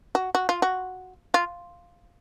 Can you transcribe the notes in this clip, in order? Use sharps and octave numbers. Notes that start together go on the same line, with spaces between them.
F#4
F#4
F4
F#4
F4